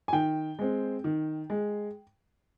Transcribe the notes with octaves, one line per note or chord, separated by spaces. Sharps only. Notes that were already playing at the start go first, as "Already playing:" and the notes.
G#5
D#3 G5
G#3 C4
D#3
G#3